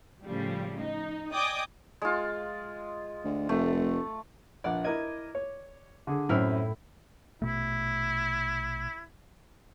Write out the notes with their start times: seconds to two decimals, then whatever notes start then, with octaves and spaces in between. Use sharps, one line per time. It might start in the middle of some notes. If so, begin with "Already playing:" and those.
0.25 A2 C#3 F3 G3
0.79 D#4
1.33 D5 D#5 G5 G#5 D6 D#6
2.02 G#3 F4
3.25 D2
3.49 F1 A3
4.64 A#1 D5 F#5
4.84 E4 A#4 D#5 D6 G#6 D#7
5.35 C#5
6.07 D3 G#4
6.29 F#2 A2 C4 E4 F6
7.42 A#1 B2 A3 E4